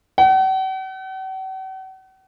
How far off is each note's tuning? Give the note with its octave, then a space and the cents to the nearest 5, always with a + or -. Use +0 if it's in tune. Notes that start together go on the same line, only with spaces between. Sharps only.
F#5 +45